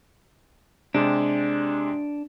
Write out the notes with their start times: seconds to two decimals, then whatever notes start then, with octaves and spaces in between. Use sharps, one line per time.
0.95 C3 G#3 D4 G4